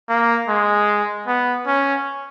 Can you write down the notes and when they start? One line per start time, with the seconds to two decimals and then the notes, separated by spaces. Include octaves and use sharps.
0.09 A#3
0.49 G#3
1.27 B3
1.67 C#4